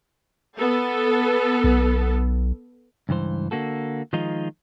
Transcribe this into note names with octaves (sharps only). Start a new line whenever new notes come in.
B3 A4
B1
C#2 G2 E3 C5
D3 A#3 F#4 A4
D#3 F3 G#3 D#4 F4